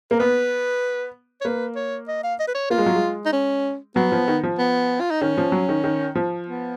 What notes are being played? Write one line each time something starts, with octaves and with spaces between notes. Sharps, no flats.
A#3 A#4
B3 B4
C#5
A#3 B4
C#5
D#5
F5
D#5
B4
C#5
A#3 F4
G#3
F#3
G#3
D#4
C#4
F#3 B3
F3
D#3
F3
B3
F4
D#4
D#3 C#4
F3
F#3
D#3
D#3
F3
B3